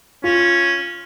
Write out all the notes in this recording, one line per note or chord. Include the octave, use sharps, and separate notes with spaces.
C#4 F4